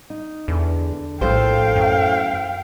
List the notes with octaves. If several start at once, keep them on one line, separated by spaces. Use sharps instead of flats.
D#4
E2 D3
A#1 A2 A4 C5 F5 G5
F#2